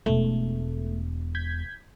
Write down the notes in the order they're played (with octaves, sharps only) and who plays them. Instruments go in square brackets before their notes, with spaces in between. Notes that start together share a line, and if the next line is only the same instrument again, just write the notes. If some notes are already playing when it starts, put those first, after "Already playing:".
[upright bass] E1 [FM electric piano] A3
[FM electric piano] G6 G#6 B6